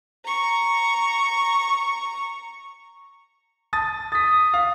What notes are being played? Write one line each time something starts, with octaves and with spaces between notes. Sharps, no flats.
A#5 C#6
A5 D#6 A6
D#6 A6 B6
F5